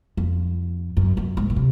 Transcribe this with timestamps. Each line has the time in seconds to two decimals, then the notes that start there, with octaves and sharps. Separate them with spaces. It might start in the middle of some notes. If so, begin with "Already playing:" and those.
0.17 F2
0.97 F#2
1.17 F#2
1.37 G#2
1.50 A#2
1.56 C3